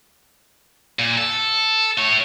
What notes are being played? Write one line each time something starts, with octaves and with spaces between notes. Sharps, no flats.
A#2
A4
A3 C#5